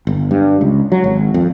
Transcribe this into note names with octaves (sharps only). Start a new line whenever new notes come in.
G1
G2
C#2
F#3
G#1
F2